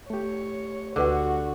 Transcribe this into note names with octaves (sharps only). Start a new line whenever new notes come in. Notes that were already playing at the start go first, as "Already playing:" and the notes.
A3 G4 C#5
D2 D3 F#4 B4 F#5